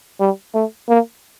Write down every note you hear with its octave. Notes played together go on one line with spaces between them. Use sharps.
G3
A3
A#3